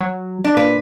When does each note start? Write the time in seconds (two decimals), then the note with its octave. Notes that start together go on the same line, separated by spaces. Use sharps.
0.01 F#3
0.44 D4
0.57 A#2 B4